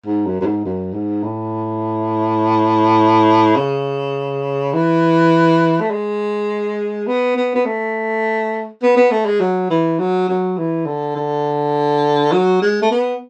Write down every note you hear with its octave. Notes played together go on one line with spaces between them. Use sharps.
G#2
F#2
F#2
G#2
F#2
G#2
A2
C#3
E3
A3
G#3
B3
B3
B3
A3
B3
B3
A3
G#3
F#3
E3
F#3
F#3
E3
D3
D3
F#3
G#3
A3
B3